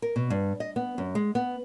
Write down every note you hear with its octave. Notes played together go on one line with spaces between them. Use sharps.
A#4
B2
G2
D#5
B3
F#2
G#3
B3